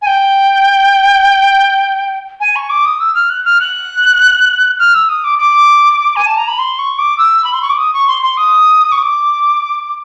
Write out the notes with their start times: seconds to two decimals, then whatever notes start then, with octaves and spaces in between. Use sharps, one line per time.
0.02 G#5
0.07 G5
2.40 G#5
2.56 C#6
2.70 D6
2.85 D#6
3.00 E6
3.15 F6
3.30 F#6
3.45 F6
3.61 F#6
4.79 F6
4.94 E6
5.09 D#6
5.24 D6
5.39 D6
6.16 G#5
6.26 A5
6.37 A#5
6.48 B5
6.59 C6
6.79 C#6
6.99 D6
7.18 E6
7.45 B5
7.54 C6
7.62 C#6
7.70 D6
7.78 D#6
7.94 C#6
8.08 C6
8.22 C6
8.37 D#6
8.92 C#6
8.98 D#6
9.03 D6